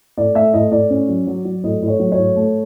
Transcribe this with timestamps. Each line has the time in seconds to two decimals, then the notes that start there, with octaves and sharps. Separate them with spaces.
0.17 A2 D5
0.35 A3 E5
0.53 A2 D#5
0.72 A2 D5
0.90 C#4
1.08 F#3
1.27 F#3
1.45 F#3
1.64 A2 D#5
1.82 A2
1.88 C#5
1.99 F#3
2.12 C#5
2.18 A2
2.36 A3